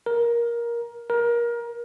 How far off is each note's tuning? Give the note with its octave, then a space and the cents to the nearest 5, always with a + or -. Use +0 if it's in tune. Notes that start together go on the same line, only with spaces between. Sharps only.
A#4 +15
A#4 +25